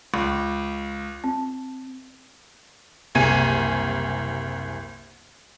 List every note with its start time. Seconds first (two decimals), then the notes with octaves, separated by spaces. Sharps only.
0.14 C#2
1.24 C4
3.15 F#1 C2 G#5 D#7